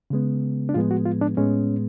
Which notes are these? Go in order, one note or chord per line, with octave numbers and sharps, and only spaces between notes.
C#3 G#3 B3
D4
A2 F3 G#3 B3 F4
F#4
F4
D4
A2 G#3 B3 C#4